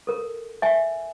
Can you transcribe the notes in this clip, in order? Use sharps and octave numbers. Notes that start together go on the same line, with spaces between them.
A4 A#4
E5 G#5